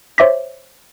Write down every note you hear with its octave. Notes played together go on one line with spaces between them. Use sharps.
C5 C#5 E5 D6 A#6 B6